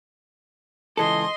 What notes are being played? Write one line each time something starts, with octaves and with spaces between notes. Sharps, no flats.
C#2 E3 A4 D#5 C6